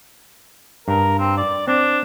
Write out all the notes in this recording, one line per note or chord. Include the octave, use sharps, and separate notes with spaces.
G2 A#4
C4
D5
C4 D4